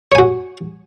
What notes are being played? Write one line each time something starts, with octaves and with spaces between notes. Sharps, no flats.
F#4 C#5 G#5